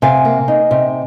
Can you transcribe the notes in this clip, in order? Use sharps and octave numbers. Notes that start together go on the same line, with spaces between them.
C3 F5 G#5
A#3
D#4
C3